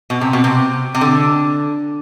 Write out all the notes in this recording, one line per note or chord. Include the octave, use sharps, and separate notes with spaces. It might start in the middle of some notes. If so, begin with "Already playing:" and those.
B2
C3
B2
C3
C3
D3